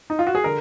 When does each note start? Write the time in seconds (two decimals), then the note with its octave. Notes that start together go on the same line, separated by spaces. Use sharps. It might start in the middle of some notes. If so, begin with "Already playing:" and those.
0.10 D#4
0.19 F4
0.27 F#4
0.35 G#4
0.44 D3 A#4